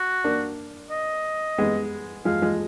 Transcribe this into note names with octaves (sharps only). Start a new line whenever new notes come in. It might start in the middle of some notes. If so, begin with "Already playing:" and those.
Already playing: F#4
A#3 D4
D#5
G#3 B3
F3 G#3 F5
F3 G#3